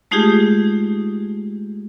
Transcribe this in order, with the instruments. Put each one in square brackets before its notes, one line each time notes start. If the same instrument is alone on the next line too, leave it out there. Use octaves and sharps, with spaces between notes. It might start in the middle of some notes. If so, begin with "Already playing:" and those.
[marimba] G#3 A3 D#4 F4 G4 G#4